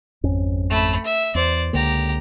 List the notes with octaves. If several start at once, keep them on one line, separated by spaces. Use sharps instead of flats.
G#1 F2 C#4
A3 B5
E5
E2 C5 D5
C#2 D3 A#3 G4 A#5